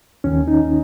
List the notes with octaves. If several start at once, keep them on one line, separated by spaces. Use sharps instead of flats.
D#2 D#3 C#4
D#4